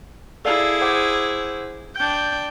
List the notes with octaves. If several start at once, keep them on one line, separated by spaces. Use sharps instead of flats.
E4 G#4 A4 D5 F5
C5 F#5 D6
D4 G5 G6